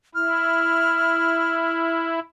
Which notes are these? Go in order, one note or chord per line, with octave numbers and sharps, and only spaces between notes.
E4 F6